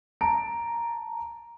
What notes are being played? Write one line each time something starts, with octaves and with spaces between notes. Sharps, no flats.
A5 A#5 D7